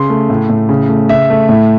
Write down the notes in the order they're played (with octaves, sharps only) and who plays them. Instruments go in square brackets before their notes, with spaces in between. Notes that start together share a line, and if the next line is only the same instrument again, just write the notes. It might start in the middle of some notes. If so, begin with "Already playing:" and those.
Already playing: [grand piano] C#3 C6
A3
A2
A2
C#3
A3
C#3 E5
A3
A2